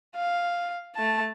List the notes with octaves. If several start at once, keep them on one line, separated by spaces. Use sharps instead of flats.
F5
A3 A5